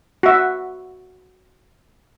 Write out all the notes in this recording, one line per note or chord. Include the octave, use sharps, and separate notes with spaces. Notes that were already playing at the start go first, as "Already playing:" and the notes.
F#4 E5